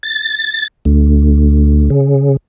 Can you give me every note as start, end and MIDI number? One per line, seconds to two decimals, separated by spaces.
0.03 0.67 93
0.85 1.89 38
1.90 2.36 49